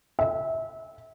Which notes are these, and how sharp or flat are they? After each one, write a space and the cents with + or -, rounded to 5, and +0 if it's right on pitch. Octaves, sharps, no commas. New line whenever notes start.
E5 -25